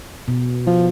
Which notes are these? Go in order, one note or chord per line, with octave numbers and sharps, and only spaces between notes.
B2
F3